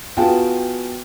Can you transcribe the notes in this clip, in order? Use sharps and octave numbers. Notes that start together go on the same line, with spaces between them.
B3 F4 F#4 G#4 G5 A5